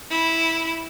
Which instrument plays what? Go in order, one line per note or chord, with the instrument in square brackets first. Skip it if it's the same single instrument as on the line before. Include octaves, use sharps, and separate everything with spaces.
[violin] E4